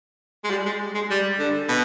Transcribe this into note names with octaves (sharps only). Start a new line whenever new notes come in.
G#3
G3
G#3
G#3
G3
D3
B2